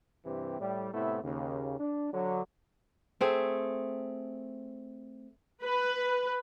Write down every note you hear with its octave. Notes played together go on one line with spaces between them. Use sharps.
G2 C3 E3 C4 G4
A2 G3
A2 C3 A3 B3 E4
D#2 C#3
D4
D3 F#3
A3 C4 G#4
B4